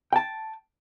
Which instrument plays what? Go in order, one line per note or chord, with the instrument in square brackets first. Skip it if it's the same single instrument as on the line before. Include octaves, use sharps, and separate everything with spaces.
[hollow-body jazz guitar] G5 A5